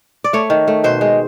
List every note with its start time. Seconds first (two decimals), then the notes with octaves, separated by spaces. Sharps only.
0.24 D5
0.33 A3 C#5
0.50 D#3
0.68 A3
0.84 B2 C5
1.01 G#3